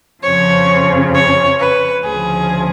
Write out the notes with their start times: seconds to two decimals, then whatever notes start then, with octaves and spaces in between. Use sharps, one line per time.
0.23 F2 C#3 F3 C#5
1.14 C#5
1.59 B4
2.04 D2 C#3 F3 G#4